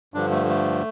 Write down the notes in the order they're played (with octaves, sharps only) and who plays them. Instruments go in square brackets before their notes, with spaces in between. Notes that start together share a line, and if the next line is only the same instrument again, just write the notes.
[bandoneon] G2 D3 F3 D4
A3
A3